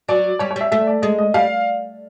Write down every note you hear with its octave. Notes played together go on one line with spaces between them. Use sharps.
F#3 D5
G3 C#5
C#5
G3 E5
A3 E5
D5
G#3 D#5
D#5
G3 F5